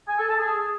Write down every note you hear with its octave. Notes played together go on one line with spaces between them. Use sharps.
G#5
A4
A5
G#4